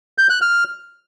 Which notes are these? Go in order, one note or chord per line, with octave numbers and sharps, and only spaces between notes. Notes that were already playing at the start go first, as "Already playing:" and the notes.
G6
F#6
F6